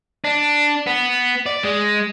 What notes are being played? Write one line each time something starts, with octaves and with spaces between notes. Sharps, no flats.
D4
B3
D5
G#3